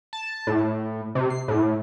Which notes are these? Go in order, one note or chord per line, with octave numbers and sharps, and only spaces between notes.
A5
A2
C3
C7
A2